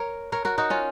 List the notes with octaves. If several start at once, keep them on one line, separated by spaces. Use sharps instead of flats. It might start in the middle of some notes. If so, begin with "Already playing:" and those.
Already playing: A#4 C#5
A#4 C#5
F#4 A#4
D#4 F#4
C#4 F4